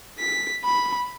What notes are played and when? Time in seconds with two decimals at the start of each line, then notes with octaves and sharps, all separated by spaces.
0.20 B6
0.65 B5